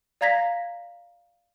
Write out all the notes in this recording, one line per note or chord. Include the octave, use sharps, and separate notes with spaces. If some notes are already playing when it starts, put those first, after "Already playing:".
D5 F5 A#5 G#6 A#6 B6